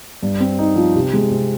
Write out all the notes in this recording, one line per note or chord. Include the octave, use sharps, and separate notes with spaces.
G2
C4
D#4
F3
C3
G#3
C3